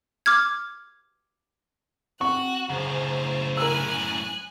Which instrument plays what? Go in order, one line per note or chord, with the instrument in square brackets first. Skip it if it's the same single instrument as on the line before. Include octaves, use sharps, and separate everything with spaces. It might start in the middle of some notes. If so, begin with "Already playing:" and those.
[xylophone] D6 F6 G#6
[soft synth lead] C4 [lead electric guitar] F#4 [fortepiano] C#6 [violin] F#6
[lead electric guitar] F#2 A2 [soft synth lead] C#3 [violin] C5
[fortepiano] A#4 E6 [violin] G#5 F#6